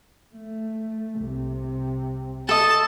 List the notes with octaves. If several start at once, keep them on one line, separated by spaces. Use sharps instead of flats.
A3
C2 C3
A4 D#5 A5